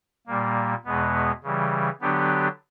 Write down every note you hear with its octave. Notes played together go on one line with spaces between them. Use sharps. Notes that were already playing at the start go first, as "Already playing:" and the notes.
A#2 G3 A#3
E2 B2 G#3 B3
C#3 E3 G3
D3 F#3 B3 D4 G4